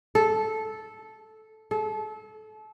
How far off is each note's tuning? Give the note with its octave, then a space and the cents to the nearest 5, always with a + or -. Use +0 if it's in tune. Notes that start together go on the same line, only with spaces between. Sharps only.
A4 -10
A4 -30